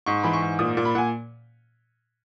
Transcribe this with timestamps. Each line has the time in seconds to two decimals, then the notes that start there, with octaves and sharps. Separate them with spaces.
0.06 G#2 C#6
0.24 E3 B5
0.33 C#6
0.42 G#2
0.59 A#2 D#6
0.77 A#2
0.85 B5
0.95 A#2 F#5 G#5